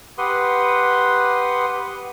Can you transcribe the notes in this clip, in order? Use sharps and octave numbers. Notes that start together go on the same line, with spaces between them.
G4 B4 F#5 C6 D#6